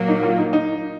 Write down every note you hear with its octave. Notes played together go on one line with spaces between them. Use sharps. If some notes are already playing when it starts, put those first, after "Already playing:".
Already playing: A#2 F#3 A#3
D#4
F4
D#4
D#4